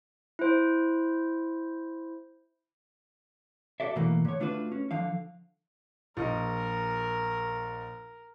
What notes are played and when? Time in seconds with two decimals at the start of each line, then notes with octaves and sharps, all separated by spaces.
0.39 E4 C5
3.80 F#4 A4 D5 E5
3.96 B2 E3 A3 A#3
4.25 D3 C#5
4.40 A3 D4 F4 F#4 B4
4.72 C#4
4.91 D3 F3 F5
6.17 A#1 A#4 D#5